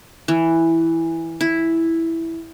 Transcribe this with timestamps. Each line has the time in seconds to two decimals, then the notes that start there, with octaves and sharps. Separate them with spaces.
0.28 E3
1.41 E4